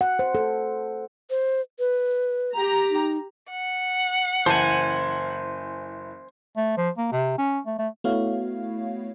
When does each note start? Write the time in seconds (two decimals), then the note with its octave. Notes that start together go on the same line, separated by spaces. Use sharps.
0.01 F#5
0.19 C5
0.35 A4
1.30 C5
1.79 B4
2.54 G4 A#5
2.90 D#4
3.50 F#5
4.46 F#1 E3 C5 G#5 A5
6.57 A3
6.77 F3
6.98 A#3
7.12 C3
7.38 C#4
7.66 A3
7.79 A3
8.04 A3 B3 E4 F#4 C#5 F5